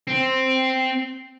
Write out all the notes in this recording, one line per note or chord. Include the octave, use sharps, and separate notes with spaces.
C4